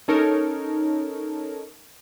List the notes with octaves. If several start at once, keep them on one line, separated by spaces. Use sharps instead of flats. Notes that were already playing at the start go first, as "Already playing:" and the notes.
C#4 D#4 A4 A#4 C#5